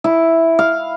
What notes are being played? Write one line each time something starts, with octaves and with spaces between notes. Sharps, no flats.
E4
F5